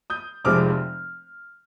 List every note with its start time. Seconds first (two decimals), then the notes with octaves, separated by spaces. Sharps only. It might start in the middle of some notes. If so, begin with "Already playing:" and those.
0.10 D#6 G6
0.45 F1 F2 C3 F3 G#3 D6 F6